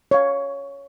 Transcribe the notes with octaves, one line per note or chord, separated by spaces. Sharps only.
C#5 F5